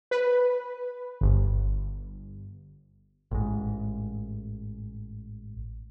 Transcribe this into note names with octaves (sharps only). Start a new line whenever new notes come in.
B4
G1
A1 G#2